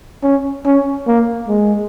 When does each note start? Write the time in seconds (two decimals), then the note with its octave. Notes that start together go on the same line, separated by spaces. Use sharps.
0.23 C#4
0.65 C#4
1.07 A#3
1.48 G#3